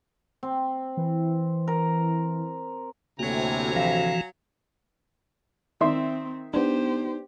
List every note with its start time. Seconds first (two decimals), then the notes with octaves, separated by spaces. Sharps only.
0.43 C4
0.97 E3
1.68 A#4
3.19 D2 A2 C3 F#3 A#3 F#4 G#5 A#5
3.76 E3 F3 F#4 F5 A#6
5.81 D#3 C4 E5 C6
6.54 B3 D4 D#4 G4 C5